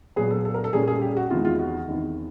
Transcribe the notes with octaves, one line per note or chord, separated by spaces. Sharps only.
A#2 F#3 B3 G#4
A4
A4
A#4
A4
A#2 G3 A#3 C#4 G#4
G#4
G4
F#4
E2 C3 D#3 G#3 F4
F4
F#4
E2 C3 D#3